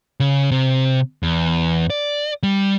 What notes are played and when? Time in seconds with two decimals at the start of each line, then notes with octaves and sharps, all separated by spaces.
0.20 C#3
0.51 C3
1.23 E2
1.90 D5
2.43 G3